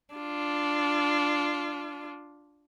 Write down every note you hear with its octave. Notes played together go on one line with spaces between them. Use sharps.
D4 F4